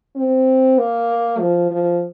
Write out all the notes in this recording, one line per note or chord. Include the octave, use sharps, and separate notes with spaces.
C4
A#3
F3
F3